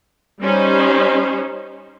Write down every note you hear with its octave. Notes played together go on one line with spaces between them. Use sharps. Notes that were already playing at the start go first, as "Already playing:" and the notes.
G3 C#4 D#4 C5